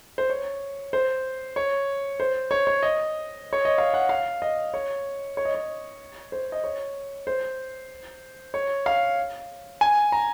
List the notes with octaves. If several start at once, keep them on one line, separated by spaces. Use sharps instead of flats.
C5
C#5
C5
C#5
C5
C#5
C#5
D#5
C#5
D#5
F5
F#5
F5
D#5
C#5
C#5
D#5
C#5
C5
D#5
C#5
C5
C#5
F5
G#5
A#5